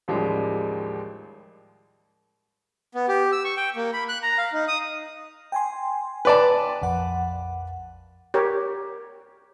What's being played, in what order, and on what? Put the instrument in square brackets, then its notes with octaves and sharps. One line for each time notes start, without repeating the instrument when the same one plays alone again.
[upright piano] A1 D#2 F3 G3 G#3
[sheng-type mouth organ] B3
G4
E6
C#6
G5
A#3
B5
F#6
A#5
F5
D#4
D#6
[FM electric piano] G5 G#5 C6
[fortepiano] B4 D5 A5
[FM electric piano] A#1 F2 F#5
[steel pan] G4 A#4 C#5